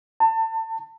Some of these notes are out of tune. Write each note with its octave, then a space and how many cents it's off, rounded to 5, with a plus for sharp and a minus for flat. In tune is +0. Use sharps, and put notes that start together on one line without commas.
A5 +30